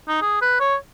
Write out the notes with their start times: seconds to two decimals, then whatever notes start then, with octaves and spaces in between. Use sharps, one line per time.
0.09 D#4
0.22 G#4
0.42 B4
0.60 C#5